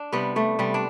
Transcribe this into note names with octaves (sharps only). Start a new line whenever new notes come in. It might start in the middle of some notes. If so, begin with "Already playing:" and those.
Already playing: D4
C3 G3 B3
G3 A3
C3 G3 B3
D4